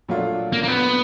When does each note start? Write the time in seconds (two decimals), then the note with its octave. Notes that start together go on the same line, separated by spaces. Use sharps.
0.08 A#2 F#3 A3 D4 F4
0.53 A#3
0.63 A#3
0.68 B3